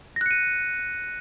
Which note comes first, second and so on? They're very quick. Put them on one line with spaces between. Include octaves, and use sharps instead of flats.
A#6 F#6 C#7 D#7